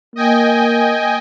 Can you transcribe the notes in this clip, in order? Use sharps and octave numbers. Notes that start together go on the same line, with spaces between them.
A#3 D#5 G5 G#5